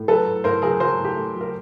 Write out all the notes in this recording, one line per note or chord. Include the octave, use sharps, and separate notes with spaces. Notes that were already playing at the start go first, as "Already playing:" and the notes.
Already playing: A2
F#3 A4 B4
A2
A2 A#4 C5
F#3 G#4 A#4
F#3 A#4 C5
A2
G4
A2
F#3
A#4